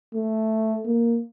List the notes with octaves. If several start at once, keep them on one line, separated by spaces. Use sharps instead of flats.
A3
A#3